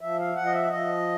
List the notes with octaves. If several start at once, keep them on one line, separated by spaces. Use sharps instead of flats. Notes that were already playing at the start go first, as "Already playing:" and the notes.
F3 E5
F5
F3 F#5
D#5
E5
F3 D#5